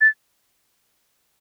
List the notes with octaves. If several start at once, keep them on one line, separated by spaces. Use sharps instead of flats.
A6